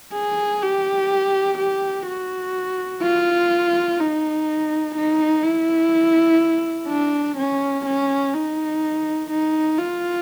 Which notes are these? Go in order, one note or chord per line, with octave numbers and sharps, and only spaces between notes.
G#4
G4
G4
F#4
F4
D#4
D#4
E4
D4
C#4
C#4
D#4
D#4
F4